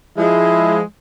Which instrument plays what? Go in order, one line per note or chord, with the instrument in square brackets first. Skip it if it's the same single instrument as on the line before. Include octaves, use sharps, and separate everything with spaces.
[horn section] F3 G#3 [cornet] E4